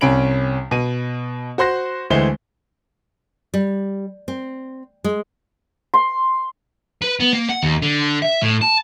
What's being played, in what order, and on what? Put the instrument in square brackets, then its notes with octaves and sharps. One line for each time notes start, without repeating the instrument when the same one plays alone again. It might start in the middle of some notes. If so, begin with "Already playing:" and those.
[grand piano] C2 C3 C#4 B5 D7 F#7
B2 D#7
F#4 C5 C6 F#6 A#6
D2 E3 G#3 A3 C5 G7
[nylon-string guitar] G3
C4
G#3
[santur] C6
[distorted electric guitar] B4
B3
A#3
F#5
D#2
D3
E5
A2
A5